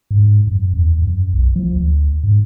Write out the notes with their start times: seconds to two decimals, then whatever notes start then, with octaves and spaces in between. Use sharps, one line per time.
0.11 G#2
0.47 F#2
0.73 E2
1.02 F#2
1.33 B1
1.56 F3
1.73 D2
2.23 G#2